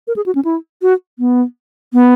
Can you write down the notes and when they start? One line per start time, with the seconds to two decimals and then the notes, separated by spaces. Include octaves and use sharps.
0.07 A#4
0.16 G#4
0.26 F#4
0.35 C#4
0.45 E4
0.82 F#4
1.19 B3
1.93 B3